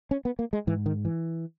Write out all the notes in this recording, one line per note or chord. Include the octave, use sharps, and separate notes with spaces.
C#4
B3
A#3
G#3
G#2 E3
D#3
E3